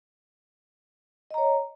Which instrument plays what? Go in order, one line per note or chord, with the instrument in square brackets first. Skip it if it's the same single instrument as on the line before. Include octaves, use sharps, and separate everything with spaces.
[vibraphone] D#5
A#5
C#5